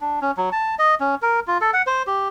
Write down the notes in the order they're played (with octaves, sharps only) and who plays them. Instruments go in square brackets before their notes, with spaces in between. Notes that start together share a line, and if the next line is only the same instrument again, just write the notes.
[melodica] D4
C#4
F#3
A5
D#5
C#4
A#4
F4
A4
F#5
C5
G4